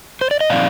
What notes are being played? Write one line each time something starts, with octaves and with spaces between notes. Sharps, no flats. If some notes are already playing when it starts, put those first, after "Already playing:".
C5
D5
D#5
A#2 F3 C4 D#4 D5 F5